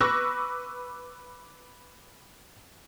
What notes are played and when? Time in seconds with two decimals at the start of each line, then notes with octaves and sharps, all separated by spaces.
0.01 B4 C#6 D6 E6 F#6 A#6